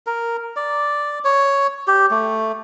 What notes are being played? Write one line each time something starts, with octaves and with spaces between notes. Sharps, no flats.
A#4
D5
C#5
G4
A3